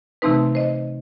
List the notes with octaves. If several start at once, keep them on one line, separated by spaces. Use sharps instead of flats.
C3 E3 A3 C4 D#4 B4
C5 D#5